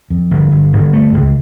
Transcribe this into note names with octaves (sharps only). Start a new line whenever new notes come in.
F2
G1
G1
G1
A3
C#2